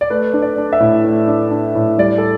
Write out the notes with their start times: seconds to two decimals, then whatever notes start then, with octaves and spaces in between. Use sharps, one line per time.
0.01 D5
0.10 A3 B4
0.34 D4
0.42 D5
0.58 D4
0.73 E5
0.80 A2
1.04 A3
1.28 D4
1.51 D4
1.75 A2
1.98 G3 D5
2.18 A4